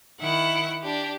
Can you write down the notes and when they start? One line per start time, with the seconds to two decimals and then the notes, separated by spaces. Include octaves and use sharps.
0.21 D#3 E4 F#5
0.83 D4 G4